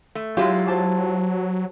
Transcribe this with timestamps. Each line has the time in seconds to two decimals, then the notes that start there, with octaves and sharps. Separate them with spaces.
0.15 A3
0.37 F#3 G#3 E4 F4 G4
0.67 C5 A5 D6